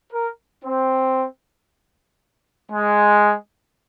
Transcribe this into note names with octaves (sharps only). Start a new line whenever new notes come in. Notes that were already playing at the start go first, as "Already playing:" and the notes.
A#4
C4
G#3